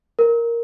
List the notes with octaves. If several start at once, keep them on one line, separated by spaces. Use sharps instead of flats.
A#4